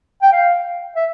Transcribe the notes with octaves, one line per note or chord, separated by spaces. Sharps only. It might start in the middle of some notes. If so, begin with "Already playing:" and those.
G5
F5
E5